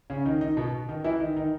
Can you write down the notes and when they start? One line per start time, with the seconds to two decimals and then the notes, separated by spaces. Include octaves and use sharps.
0.10 C#3 C#4
0.25 D#3 D#4
0.41 D#3 D#4
0.57 B2 B3
0.89 D#3 D#4
1.04 E3 E4
1.20 D#3 D#4
1.36 D#3 D#4